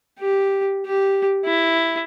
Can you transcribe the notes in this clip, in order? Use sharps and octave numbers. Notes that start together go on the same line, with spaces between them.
G4
G4
E4